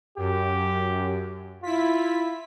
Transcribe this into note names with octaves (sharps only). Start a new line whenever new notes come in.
F#2 G4
E4 F4 B6